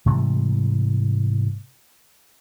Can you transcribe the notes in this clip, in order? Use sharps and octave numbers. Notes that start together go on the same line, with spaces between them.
G#2 C3 E3 G3